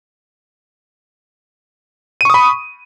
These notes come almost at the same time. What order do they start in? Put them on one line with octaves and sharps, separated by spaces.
D#7 C#6 D#6 B5